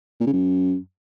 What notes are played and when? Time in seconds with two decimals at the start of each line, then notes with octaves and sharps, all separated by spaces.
0.20 A#2
0.27 C#3
0.33 F#2